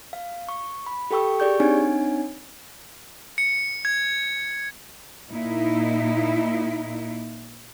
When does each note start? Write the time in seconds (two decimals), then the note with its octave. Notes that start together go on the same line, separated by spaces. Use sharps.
0.13 F5
0.49 C#6
0.86 B5
1.11 G4 A4 G5 C#6 E6
1.40 G4 G#4 D5 C#6 G6
1.60 C4 D4 D#4 C#5 G#5
3.38 C#7
3.85 G#6
5.29 A#2 D#4 E4